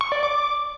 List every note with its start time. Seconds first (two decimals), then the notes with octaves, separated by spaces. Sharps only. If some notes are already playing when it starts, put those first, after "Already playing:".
0.01 C#6
0.12 D5
0.23 D6